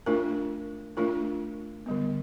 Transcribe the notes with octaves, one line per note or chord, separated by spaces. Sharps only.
A3 D4 F4 A#4
A3 D4 F4 A#4
D3 G3 B3